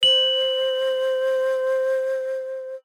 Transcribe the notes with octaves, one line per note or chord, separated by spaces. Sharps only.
C5 F#7